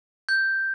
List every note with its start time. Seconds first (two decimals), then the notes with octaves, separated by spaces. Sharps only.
0.29 G6